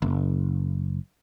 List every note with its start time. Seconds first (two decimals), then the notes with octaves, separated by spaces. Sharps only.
0.02 F#1